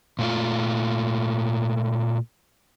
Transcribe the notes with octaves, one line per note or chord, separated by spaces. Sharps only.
A#2 A3 F4